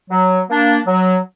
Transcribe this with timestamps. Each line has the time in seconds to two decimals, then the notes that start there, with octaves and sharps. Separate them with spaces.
0.10 F#3
0.49 A#3 D4
0.87 F#3